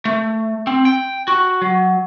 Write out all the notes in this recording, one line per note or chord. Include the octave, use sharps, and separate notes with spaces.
A3
C4
G5
F#4
F#3